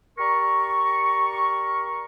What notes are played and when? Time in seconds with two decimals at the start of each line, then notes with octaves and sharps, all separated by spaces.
0.18 G4 A#4 D5 A#5 C#6